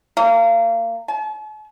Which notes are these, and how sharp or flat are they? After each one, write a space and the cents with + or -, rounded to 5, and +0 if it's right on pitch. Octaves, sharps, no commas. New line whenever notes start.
A#3 -30
A5 -45